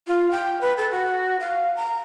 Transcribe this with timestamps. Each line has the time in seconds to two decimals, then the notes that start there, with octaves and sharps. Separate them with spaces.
0.08 F4
0.31 G5
0.61 B4
0.77 A4
0.91 F#4
1.40 F5
1.76 A#5